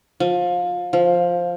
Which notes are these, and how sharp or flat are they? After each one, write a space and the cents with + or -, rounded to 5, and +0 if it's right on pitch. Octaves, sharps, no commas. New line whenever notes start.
F3 +25
F3 +5